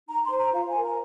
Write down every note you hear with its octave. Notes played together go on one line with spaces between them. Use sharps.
D#4 A#5
C6
C5
A#5
F4 F5
G#5
A#4
A#5